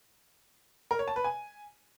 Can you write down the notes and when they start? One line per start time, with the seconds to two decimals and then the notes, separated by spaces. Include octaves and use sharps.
0.91 A#4
0.99 C#5
1.08 A5
1.16 B4
1.24 G#5